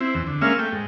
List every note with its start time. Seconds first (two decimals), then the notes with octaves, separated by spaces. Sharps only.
0.01 C4 E4
0.14 E2
0.27 D3
0.42 G#3 A#3 C#4 E5 F5
0.59 A3 G5
0.72 G#2